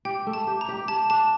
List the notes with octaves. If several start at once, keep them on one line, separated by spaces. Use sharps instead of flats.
G4 G5
A3
A5
G4
A#5
G4
G4 A5
D4 A5